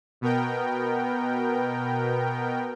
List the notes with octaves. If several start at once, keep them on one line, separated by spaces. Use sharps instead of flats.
B2 B3 A#4 G5